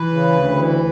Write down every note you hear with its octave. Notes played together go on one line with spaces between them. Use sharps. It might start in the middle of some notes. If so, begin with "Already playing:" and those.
Already playing: E3 B4
C#3
D2
E3